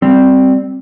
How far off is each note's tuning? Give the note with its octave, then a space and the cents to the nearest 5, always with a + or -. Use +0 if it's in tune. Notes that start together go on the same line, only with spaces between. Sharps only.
G3 +0 C4 +0